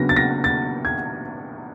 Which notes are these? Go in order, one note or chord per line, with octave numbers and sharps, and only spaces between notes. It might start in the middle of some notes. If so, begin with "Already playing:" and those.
Already playing: C#3 F#3 B3 D4 A#6
A6
A#6
A6
G#6